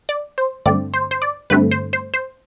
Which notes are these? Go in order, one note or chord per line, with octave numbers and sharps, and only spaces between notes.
D5
C5
G2 D3 A3 C4 D5
C5
C5
D5
G2 D3 A3 C4 B4
C5
C5
C5